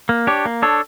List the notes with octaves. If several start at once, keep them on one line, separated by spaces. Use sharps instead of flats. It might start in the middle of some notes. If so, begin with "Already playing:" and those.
A#3
D4 G4 C#5
A#3
D4 A4 C#5